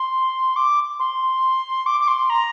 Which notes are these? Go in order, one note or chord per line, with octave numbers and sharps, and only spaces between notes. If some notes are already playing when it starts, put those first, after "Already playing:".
Already playing: C6
D6
C6
D6
D6
C6
A#5